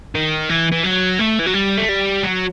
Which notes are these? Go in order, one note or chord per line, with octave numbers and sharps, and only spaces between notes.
D#3
E3
E3
F#3
A3
E3
F#3
G3
A3
G3
F#3